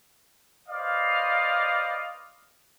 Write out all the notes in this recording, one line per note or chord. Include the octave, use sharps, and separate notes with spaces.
B4 C5 D5 D#5 F5